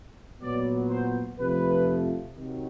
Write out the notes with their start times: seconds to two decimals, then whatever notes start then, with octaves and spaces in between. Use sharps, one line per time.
0.41 A#2 F#3 B3 D5
0.89 C5
1.38 F2 C3 F3 A3 B4
2.36 C3 D#3 F#3